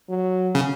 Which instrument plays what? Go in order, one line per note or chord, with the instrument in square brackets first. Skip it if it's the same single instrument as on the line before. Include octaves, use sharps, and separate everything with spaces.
[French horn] F#3
[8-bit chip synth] C#3